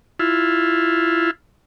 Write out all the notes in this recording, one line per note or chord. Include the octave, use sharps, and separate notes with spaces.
E4 F4